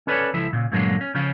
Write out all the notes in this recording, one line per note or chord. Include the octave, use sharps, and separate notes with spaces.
C#4 A4 B4 C#5 D5
C#2 F3 E4 A4
A#2 C#3
G2 A#2 D3 F#3 G#3 A#3
C#4
C#3 F3 C#4 F4